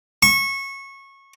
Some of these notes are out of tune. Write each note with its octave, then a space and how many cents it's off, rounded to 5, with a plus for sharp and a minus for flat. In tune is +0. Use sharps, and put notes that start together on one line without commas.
C#6 -20